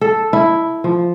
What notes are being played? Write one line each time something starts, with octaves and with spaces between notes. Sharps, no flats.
A4
E4
F3